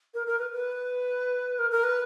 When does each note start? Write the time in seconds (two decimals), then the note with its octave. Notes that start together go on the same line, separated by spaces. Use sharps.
0.14 A#4
0.27 A#4
0.39 B4
0.51 B4
1.59 A#4
1.71 A#4
1.84 B4